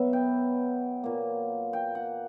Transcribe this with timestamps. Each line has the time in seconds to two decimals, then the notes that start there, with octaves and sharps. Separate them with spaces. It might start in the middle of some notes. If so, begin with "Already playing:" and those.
Already playing: B2 F#3 B3 E5
0.13 G5
1.04 A#2 A#3
1.73 G5
1.95 F#5